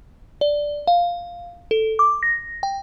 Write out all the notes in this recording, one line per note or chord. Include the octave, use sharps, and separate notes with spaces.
D5
F5
A4
D6
A#6
G5